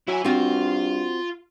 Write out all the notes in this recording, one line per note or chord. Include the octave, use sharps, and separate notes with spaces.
F#3 E4 G#5
G2 C4 F4 F#4